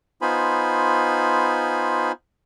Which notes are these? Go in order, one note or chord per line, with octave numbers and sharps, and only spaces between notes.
B3 D#4 F4 C5 G#5 B5